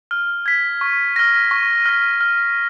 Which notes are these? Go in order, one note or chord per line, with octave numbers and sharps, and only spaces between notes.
F6
G#6 B6
C#6
F6 A#6
C#6
F6 A#6
F6